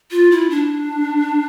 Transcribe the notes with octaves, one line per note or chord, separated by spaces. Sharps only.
F4
E4
D4